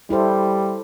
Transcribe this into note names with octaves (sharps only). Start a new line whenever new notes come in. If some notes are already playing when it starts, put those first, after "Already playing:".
G3 E4 A4 C5